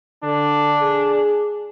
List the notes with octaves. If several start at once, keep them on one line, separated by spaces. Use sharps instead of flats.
D3 D4
G#4